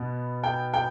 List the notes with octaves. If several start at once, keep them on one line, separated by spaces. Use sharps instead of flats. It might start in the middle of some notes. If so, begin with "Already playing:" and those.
Already playing: B2 B3
G5
G5